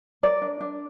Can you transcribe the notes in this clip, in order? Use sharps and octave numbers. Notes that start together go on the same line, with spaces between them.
A#4 D5
D4
D4